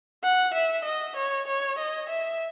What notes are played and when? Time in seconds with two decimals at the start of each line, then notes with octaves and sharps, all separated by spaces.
0.23 F#5
0.54 E5
0.85 D#5
1.16 C#5
1.47 C#5
1.78 D#5
2.09 E5